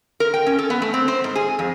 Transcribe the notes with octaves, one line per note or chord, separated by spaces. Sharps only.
A#4
G5
C#4
A4
B3
A3
C4
C5
G#2
G#4
F2